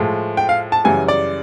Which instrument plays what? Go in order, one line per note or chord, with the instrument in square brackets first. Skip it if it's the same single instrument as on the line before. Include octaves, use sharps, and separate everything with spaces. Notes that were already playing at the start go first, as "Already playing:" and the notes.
Already playing: [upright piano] A2 F3 G#3
G5
F5
A5
F#2 C#3 E3 G3 G#5
D5